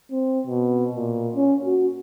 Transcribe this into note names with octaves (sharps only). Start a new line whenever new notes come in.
C4
B2
A#2
C#4
F#4